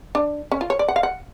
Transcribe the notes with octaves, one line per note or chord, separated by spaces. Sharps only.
D4
C#4
F4
C#5
D5
F#5
F5
F#5